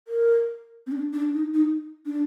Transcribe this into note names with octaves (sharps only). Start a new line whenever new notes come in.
A#4
C4
D4
D4
D#4
D#4
D4